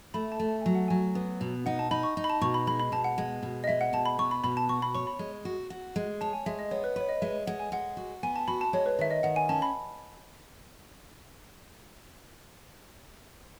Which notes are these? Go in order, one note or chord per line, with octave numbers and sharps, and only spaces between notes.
A3 B5
A5
A3
A5
F#3 G#5
F#5
F#3 G#5
B3
B2
D#4 F#5
A5
D#4 B5
C#6
D#4
B5
A5
B2 C#6
B5
G#3 B5
B5
B2 A5
F#5
G#3
B2
D#5
G#3 E5
F#5
B2 A5
B5
B3 C#6
B5
B2 B5
A5
F#4 C#6
B5
C#5 C#6
B5
G#3
F#4
F#4
G#3
C#5 A5
G#5
G#3 E5
D#5
B3 C#5
B4
B4 C#5
D#5
G#3 E5
G#3 F#5
G#5
G#3 F#5
F#4
B3 G#5
A5
F#4 B5
A5
G#3 C#5
B4
D#3 E5
D#5
D#3 F#5
G#5
C#4 A5
B5